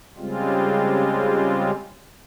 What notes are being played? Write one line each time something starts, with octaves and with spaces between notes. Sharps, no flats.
C#3 G3 G#3 C4 F4